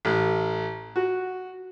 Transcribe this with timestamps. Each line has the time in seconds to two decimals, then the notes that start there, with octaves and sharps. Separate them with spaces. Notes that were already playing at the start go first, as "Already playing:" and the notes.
0.05 A1
0.96 F#4